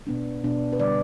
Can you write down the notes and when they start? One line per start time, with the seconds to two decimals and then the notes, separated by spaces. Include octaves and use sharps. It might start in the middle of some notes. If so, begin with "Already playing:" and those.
0.07 B2 B3 D4
0.44 B2 B3 D4
0.73 B4
0.79 D3 G3 B3 D4 D5